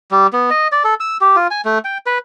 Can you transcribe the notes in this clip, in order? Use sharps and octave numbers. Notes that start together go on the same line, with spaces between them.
G3
B3
D#5
D5
A4
E6
G4
F4
G#5
A3
G5
B4